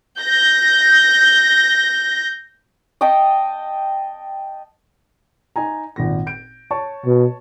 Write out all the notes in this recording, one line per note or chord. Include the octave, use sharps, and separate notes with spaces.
G6 A#6
D#5 G5 A5 D#6
D#4 G#5 A#5
G#1 A#2 A#6
G6 D7
C#5 A5 C#6
B2